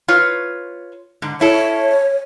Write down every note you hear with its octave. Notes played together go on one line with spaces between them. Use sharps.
F4 B4 C#5
G#2 D3
E4 A4 C#5